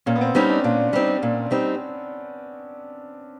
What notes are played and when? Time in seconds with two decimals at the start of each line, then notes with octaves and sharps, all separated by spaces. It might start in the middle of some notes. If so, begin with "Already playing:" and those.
0.06 A#2 C#4
0.15 B3
0.21 C4
0.35 G3 C4 C#4 D#4
0.50 D4
0.64 A#2 D4
0.93 G3 C4 D#4
1.23 A#2
1.51 G3 C4 D#4